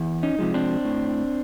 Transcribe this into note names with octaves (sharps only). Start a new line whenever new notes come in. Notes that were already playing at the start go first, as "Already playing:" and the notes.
Already playing: E2
C#4 D#4
C3 F3 G#3
C4 D4
A2